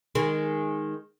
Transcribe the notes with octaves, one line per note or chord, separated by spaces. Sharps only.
D#3 G#3